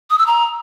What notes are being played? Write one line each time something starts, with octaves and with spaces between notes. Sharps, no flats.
D#6
E6
A#5